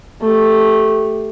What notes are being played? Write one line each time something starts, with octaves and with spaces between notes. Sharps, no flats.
A3 G4